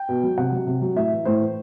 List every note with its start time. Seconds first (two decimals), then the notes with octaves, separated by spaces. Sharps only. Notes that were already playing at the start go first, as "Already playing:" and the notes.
Already playing: G5
0.09 B2
0.23 F#3
0.38 C3 F#5
0.52 F#3
0.67 C3
0.82 F#3
0.96 A2 E5
1.12 E3
1.25 A2 C5
1.41 E3